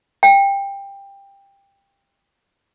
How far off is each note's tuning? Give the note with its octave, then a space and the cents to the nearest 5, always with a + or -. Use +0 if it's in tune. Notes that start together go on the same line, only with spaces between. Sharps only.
G5 +15